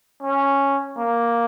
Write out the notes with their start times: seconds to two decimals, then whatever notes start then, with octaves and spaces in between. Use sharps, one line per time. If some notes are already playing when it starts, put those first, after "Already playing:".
0.23 C#4
0.98 A#3